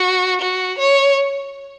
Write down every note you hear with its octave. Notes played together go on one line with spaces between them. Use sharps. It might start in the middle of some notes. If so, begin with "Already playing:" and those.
Already playing: F#4
F#4
C#5